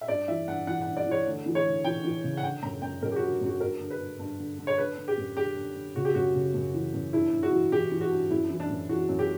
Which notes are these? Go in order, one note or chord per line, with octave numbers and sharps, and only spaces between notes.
E5
G2 D5
E3 E5
G2 F#5
E3 F#5
G2 F#5
D5
E3
C#5
D2
E3
C#5
D2
E3 G5
E3
C#3
F#5
D3 G5
F#2 A#5
F#2 G5
F#2 A#4
G4
F#4
D3
F#2 F#4
G2 A#4
D3
B4
G2
G2
D3
D3
C#5
D3 B4
D3
G4
F#2
D3 G4
D3
D3
C#3 F#4
G4
F#2 F#4
C#3
F#2
E3
F#2
G2 E4
G2
F#4
E3
E3 G4
E3
F#4
G2
F#2 E4
E3
D4
F#2
E3 F#4
F#2
G4